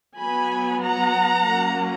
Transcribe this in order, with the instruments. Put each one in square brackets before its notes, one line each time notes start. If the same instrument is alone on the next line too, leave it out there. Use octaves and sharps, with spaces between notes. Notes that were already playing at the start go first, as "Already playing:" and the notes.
[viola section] F#3 B3 G#5 B5
F#5 A#5
F#3 A#3 C#4